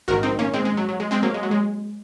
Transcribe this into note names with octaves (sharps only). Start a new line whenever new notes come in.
A#1 G#2 D#3 F#4 A#4
C4 D#4
A#3 C#4
G#3 C4
G#3
F#3
F#3
G#3
G#3 C4
F#3 A#3
G#3
F#3
G#3